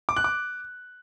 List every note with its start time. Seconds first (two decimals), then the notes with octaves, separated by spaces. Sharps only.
0.09 D6
0.17 F#6
0.24 D6